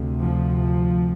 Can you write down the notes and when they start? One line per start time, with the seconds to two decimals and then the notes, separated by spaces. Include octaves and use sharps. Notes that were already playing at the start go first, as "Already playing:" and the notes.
Already playing: D2 C3
0.22 F3